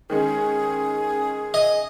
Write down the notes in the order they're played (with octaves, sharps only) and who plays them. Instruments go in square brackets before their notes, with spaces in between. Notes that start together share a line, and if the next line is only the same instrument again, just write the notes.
[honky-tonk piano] D#3 G#3 C#4 [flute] G#4
[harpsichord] D#5